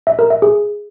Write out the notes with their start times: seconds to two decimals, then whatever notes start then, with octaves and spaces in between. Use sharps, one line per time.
0.07 E5
0.19 A#4
0.30 E5
0.42 G#4